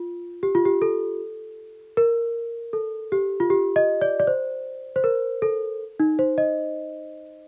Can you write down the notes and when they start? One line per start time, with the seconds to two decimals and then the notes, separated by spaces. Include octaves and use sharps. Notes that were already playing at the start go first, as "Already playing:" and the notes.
Already playing: F4
0.43 G4
0.55 F4
0.65 G4
0.82 A4
1.97 A#4
2.73 A4
3.12 G4
3.40 F4
3.50 G4
3.76 D#5
4.01 D5
4.20 D5
4.27 C5
4.96 C5
5.04 A#4
5.42 A4
6.00 D#4
6.19 C5
6.38 D#5